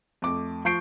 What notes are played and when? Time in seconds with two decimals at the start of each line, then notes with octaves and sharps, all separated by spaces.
0.22 F2 A3 D6
0.65 F3 C#6 G6 C7 D7